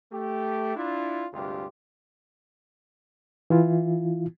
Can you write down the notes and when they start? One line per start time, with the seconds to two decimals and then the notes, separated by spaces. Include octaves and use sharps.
0.13 A3 G4
0.76 D4 E4 F4
1.33 D2 G2 C3 G#3 F4 G4
3.50 E3 E4 F4